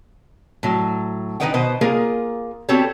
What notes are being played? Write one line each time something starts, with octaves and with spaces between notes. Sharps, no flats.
A2 F#3
D#3 D#4 B4 D#5 F#5 G5
B2 B4 C5 D#5
A#3 F4 G#4 A#4
B3 C4 F#4 G4 A4 C#5